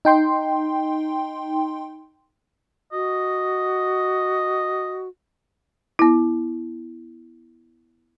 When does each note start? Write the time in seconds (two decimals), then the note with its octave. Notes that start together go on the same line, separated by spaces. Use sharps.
0.05 D#4 G5 C6
2.92 F#4 D#5
5.99 B3 E4